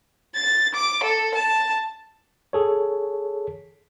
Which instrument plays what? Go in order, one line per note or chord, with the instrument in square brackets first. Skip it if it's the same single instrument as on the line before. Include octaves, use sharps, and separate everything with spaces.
[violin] A6
D6
A4
A5
[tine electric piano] G#4 A4 C#5